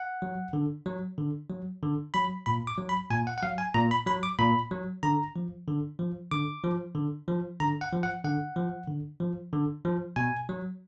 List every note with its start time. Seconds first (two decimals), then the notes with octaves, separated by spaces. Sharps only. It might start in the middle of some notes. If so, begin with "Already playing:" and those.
Already playing: F#5
0.22 F#3
0.53 D3
0.86 F#3
1.18 D3
1.50 F#3
1.82 D3
2.14 F#3 B5
2.46 A#2 B5
2.67 D6
2.78 F#3
2.89 B5
3.11 A#2 G#5
3.27 F#5
3.38 F#5
3.42 F#3 F5
3.58 G#5
3.74 A#2 A#5
3.91 B5
4.06 F#3 B5
4.23 D6
4.39 A#2 B5
4.71 F#3
5.03 D3 A#5
5.36 F3
5.67 D3
5.99 F3
6.31 D3 D6
6.64 F3
6.95 D3
7.28 F3
7.60 D3 A#5
7.81 F#5
7.92 F3
8.03 F#5
8.24 D3 F#5
8.56 F3
8.88 D3
9.20 F3
9.53 D3
9.85 F3
10.16 B2 G#5
10.49 F#3